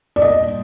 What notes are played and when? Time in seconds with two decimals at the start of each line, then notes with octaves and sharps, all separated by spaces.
0.16 D5
0.21 A#2 G3 D4 D#5